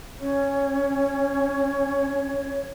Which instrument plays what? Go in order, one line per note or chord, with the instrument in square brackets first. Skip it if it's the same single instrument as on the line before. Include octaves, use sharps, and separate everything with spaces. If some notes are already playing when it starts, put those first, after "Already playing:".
[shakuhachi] C#4 [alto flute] C#5